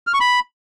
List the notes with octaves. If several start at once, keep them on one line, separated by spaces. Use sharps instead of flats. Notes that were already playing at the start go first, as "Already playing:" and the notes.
F6
C#6
B5